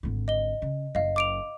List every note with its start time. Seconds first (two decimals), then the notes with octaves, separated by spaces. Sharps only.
0.03 G#1 D3
0.28 D#5 G7
0.62 C#3
0.95 F#1 D#5 F5
1.16 D6 D7 F7